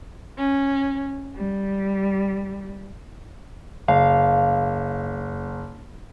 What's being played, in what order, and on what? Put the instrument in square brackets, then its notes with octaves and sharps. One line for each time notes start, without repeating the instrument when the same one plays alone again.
[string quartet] C#4
G3
[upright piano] F#1 [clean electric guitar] F5